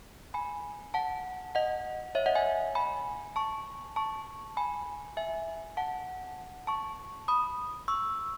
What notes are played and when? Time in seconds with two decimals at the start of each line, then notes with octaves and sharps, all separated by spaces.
0.34 G#5 B5
0.94 F#5 A5
1.55 D#5 F#5
2.15 C#5 E5
2.26 D#5 F#5
2.35 E5 G#5
2.75 G#5 B5
3.36 A5 C#6
3.96 A5 C#6
4.57 G#5 B5
5.17 E5 G#5
5.77 F#5 A5
6.67 A5 C#6
7.28 B5 D#6
7.88 C#6 E6